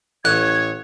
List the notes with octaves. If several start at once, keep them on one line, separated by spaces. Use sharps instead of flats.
A1 C#5 F#6 G#6